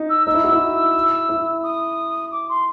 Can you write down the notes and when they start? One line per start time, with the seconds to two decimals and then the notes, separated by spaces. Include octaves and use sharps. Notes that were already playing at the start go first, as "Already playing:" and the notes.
Already playing: D#4
0.09 E6
0.26 D#4 E6
0.34 E4
0.44 F#4
0.52 E4
1.29 E4
1.63 D#6
2.31 D6
2.49 C6